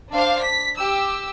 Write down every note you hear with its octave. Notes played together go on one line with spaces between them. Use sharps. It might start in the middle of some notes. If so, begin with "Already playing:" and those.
D4 C5 F5
B6
G4 E6